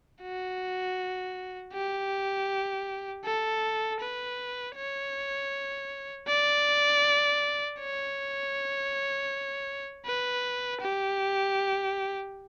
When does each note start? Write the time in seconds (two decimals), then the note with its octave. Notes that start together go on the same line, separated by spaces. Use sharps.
0.22 F#4
1.73 G4
3.25 A4
4.01 B4
4.76 C#5
6.28 D5
7.79 C#5
10.06 B4
10.81 G4